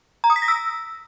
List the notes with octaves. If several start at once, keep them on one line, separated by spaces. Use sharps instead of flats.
A#5
D#6
B6
A#6
E6